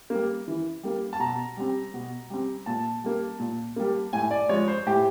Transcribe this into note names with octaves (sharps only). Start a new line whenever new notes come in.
G3 A#3
E3
G3 A#3
A5
B2 A#5
G3 C4
B2
G3 C4
A#2 A5
G3 A#3
A#2
G3 A#3
A2 G#5
D5
F3 G#3 C#5
C5
A2 G4